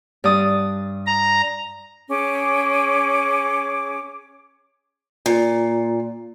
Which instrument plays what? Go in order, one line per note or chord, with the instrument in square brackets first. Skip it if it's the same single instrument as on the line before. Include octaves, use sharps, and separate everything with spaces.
[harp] G2 D5 D#6
[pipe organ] A#5
[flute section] C#4 G#4 D6
[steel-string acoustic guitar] A#2